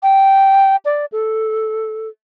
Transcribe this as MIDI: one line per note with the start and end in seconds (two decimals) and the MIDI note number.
0.03 0.76 79
0.85 1.05 74
1.12 2.08 69